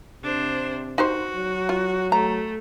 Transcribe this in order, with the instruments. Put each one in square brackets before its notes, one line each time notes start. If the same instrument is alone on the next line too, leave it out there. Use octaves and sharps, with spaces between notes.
[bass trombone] C3 [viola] D4 C5
[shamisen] D#4 G4 C5 [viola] F#4
[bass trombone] F#3
[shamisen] F4
[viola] A3 [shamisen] A#5